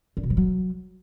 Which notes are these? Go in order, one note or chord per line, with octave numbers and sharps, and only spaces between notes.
D3
B2
F3
F#3